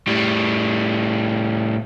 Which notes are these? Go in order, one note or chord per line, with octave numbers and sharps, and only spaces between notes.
A2 G3